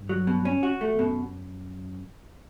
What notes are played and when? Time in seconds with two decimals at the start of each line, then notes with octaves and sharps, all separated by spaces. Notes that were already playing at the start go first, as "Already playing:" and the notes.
Already playing: G2
0.09 F#3
0.27 B2
0.45 C#4
0.63 F#4
0.81 A3
0.94 E2
0.99 F#2 B2